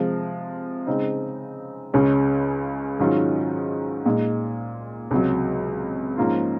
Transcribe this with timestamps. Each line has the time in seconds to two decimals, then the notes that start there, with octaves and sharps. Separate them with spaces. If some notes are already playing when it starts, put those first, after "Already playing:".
Already playing: C3 F3 G#3
0.87 C#3 G#3 C4 D#4
1.93 C#2 C#3 G#3 C#4
2.99 G#2 D#3 F#3 C#4 F4
4.05 A#2 G#3 D#4
5.11 C#2 C3 F#3
6.18 G#2 F3 A#3 C#4 F4